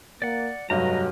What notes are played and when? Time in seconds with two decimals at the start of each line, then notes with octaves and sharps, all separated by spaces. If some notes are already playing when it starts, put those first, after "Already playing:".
0.22 A#3 D5 F#5
0.70 F1 G2 F#3 G3 D#5 A#5